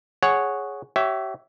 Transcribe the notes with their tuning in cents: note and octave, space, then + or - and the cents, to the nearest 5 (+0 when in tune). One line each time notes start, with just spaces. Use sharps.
G#4 +0 C#5 +0 F#5 +0
G4 -35 C#5 +0 E5 +0